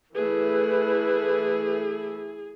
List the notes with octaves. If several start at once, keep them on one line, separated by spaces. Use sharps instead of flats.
E3 A3 E4 G#4 B4